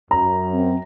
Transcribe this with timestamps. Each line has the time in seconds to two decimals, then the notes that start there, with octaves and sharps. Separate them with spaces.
0.11 F#2 A#5
0.52 C4